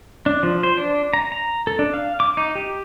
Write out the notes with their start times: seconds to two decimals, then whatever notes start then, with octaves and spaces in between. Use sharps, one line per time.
0.26 D4
0.43 F3
0.63 C5
0.77 D4
1.13 A#5
1.32 A#5
1.67 A4
1.79 D4
1.94 F5
2.20 D6
2.37 D#4
2.55 G4